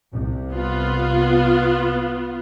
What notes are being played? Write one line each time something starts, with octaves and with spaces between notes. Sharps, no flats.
C2 C3
B3 F4